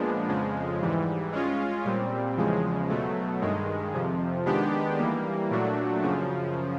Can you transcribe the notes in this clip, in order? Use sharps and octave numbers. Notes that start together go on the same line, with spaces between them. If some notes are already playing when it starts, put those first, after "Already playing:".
Already playing: A#2 F3 G#3 B3 D4
F2 C#3 F3 G#3
G#2 E3 G3
G#3 C#4 F4
A#2 G3 C4
E2 C#3 F3 G#3
B2 F#3 A3
G2 D#3 G#3
F2 C3 F3
D#3 G#3 B3 D4 G4
E3 G3 A#3
A#2 F#3 A3 D4 F#4
F#2 C#3 F3